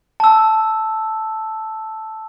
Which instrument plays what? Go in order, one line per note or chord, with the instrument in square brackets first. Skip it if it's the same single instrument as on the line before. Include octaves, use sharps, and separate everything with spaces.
[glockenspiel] A5 E6